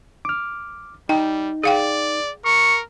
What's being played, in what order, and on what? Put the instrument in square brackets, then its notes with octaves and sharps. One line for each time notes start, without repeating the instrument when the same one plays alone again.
[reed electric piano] D6 F6
[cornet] G3 [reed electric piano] D#4 [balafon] G5
[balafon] G#4 F5 G5 [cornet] D5
[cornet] A#4 [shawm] C#6